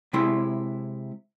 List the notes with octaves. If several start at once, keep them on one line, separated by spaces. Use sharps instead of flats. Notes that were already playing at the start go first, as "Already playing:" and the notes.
C3 G#3 E4 C6